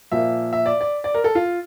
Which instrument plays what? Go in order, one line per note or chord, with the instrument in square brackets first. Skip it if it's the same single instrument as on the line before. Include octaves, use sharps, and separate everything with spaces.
[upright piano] A#2 F3 A#3 E5
E5
D5
D5
D5
A#4
A4
F4